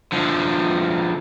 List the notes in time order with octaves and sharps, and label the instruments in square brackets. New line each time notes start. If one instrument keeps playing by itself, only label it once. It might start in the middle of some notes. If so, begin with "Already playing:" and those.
[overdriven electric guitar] D3 F3